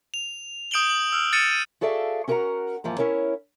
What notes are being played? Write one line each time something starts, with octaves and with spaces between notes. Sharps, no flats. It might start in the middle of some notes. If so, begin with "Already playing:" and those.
F7
D#6 G6 D7 E7 F#7 G7
F#7
E6 F6
E6 F6 A6 C#7 D#7 E7
D#7
F#4 G#4 A4 D5 E5 F5
C#4 F#4 A#4 F5 F#5 A#5
G#2 E3 F3 A#3 A#5
C#4 E4 A#4 C#5